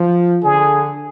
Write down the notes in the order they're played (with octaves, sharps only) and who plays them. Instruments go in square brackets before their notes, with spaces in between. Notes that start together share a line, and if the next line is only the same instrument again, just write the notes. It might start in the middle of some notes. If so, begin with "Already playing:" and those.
Already playing: [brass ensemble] F3
[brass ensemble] D3 [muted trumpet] G#4